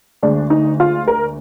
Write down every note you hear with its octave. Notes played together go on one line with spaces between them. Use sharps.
D2 D3 G#3 D4
D#4
F4
A#4